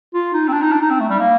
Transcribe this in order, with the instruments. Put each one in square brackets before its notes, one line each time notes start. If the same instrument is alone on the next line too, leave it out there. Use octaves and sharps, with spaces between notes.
[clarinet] F4
D#4
C4
D4
D#4
D4
D#4
C4
A3
G3
A#3